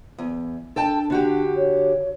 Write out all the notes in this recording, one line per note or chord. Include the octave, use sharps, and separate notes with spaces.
E2
D4 A4 G5 A5
D3 F#4 G4
C#5